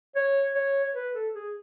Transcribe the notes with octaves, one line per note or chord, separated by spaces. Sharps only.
C#5
C#5
B4
A4
G#4